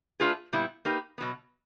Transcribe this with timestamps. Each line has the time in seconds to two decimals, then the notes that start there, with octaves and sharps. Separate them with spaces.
0.20 A3 D4 F4 G#4 B4
0.53 A#2 G3 B3 E4
0.85 A#3 D#4 G4 B4
1.18 B2 F#3 B3